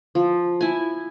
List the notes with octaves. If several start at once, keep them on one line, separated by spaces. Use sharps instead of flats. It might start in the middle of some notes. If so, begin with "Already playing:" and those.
F3
E4 G#5